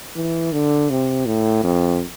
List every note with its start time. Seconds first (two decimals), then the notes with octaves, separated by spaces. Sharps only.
0.16 E3
0.52 D3
0.90 C3
1.26 A2
1.64 F2